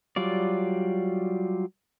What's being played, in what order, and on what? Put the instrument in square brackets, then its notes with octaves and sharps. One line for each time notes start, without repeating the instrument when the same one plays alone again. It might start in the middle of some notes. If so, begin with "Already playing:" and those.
[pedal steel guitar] F#3 G3 F4 D5